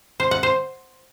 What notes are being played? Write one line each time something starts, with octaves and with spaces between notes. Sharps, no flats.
C5
F#5
C5